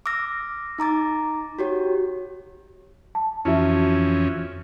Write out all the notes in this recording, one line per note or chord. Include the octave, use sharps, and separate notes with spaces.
D6 E6 F6 A#6
D#4 A#5 D6 A6
F#4 G4 C#5
A5
F2 E3 C#4 E4 F#4 E5